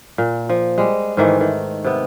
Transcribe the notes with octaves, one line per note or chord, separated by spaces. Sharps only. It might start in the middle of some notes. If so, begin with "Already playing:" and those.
A#2
F3
G3 G#3
G#2 D#3 E3 A3
D#3
C3 B3